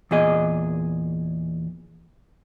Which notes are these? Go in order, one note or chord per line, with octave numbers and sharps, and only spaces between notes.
E2 A#2 G#4 D#5